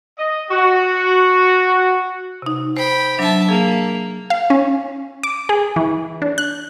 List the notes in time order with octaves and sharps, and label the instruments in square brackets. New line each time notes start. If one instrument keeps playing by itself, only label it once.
[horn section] D#5
F#4
[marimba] C3 D#4
[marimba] C5 [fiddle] G5 B5
[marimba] F#3 D4 [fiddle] E5 A5
[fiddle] A#3 [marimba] G#4
[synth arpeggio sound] F5
C#4
D6
G#4
E3
D4
F#6